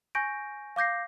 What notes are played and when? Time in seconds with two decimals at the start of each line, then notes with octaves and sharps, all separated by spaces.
0.15 G#5 C#6 G6 A#6 D7
0.76 F5 D6 G6 A#6 C7